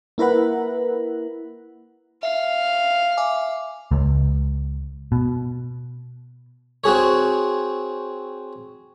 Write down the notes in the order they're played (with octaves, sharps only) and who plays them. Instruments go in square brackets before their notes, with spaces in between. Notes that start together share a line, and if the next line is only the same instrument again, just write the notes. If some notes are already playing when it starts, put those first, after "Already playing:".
[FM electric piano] A#3 E4 A#4 B4 F#5
[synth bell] E5 [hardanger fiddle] F5
[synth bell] E5 G#5 D6
[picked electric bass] C#2
B2
[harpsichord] C4 F#4 G#4 C#5